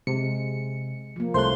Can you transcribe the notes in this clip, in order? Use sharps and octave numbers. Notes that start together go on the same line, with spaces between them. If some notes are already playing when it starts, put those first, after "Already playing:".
C3 G#3 C#7
F3 A#3
C2 A3 C5 C6 F#6